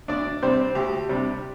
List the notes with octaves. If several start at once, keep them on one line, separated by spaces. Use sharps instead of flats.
D2 D4 D5
C3 G3 C4 D4 C5
D2 G4
C3 G3 D4